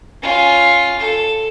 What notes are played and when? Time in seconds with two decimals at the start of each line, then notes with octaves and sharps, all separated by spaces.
0.22 C#4 F4
1.00 A4